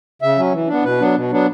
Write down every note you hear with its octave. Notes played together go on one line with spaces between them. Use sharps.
C#3 E5
F#3 C#4
E3
B3 D4
B2 B4
F#3 B3 D4
B2
F#3 B3 D4